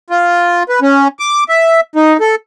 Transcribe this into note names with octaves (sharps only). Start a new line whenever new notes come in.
F4
B4
C#4
D6
E5
D#4
A4